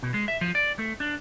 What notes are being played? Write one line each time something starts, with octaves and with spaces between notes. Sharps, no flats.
B2
G#3
E5
F3
D5
A3
D4